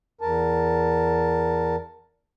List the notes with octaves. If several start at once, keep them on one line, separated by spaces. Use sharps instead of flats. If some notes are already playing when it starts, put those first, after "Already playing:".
E2 A#4 A5